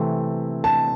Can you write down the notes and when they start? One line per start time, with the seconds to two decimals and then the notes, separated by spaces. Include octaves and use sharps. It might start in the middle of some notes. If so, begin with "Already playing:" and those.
Already playing: C3 E3 A3 C4
0.64 A5